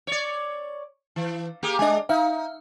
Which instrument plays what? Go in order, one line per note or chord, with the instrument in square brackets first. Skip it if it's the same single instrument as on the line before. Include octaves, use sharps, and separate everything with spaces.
[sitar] C#5 D5
E3
A#3 G4 G#4
[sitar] G#3 D4 [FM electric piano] D#5 G#5
[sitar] D#4 [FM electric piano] E5 F5